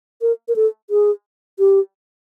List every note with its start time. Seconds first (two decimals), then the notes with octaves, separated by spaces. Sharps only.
0.22 A#4
0.48 A#4
0.56 A4
0.90 G#4
1.59 G4